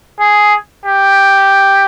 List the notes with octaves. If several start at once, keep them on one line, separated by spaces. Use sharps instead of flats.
G#4
G4